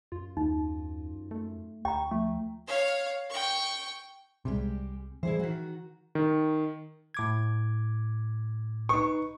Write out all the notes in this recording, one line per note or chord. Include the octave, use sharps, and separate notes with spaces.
F#2 F4
D#2 D#4
A3
D2 G5 A#5 C#6
F3 A3
C#5 F5
G5 C#6
C2 C3 G3 G#3 G4
E3 G3 E4 G#4 C5
D#3 E3 F#4
D#3
A2 D6 G#6
D#4 B4 C#6